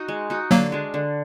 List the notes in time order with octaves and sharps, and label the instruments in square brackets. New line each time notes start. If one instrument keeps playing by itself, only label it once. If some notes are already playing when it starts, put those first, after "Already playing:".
Already playing: [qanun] D#4 F#4
G#3
D#4 F#4
[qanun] D3 [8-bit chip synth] F#3 A#3
[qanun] G#3 D4
D3